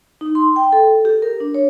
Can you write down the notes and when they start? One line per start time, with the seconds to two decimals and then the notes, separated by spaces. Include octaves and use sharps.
0.21 D#4
0.35 C6
0.56 G5
0.73 A4
1.05 G4
1.22 A#4
1.40 D4
1.54 C#5